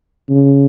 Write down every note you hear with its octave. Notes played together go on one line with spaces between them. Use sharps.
C#3